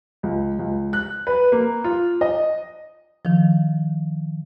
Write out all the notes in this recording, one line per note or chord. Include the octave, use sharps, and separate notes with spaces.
C#2
C#2
F#6
B4
A#3
F4
D#5
D#3 F3